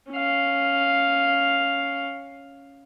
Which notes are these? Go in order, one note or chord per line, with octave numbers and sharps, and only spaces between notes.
C#4 F5